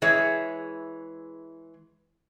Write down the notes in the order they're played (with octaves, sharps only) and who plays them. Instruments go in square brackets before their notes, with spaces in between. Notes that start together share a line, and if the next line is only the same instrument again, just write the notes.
[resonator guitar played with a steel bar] E3 G#3 G#4 C#5 E5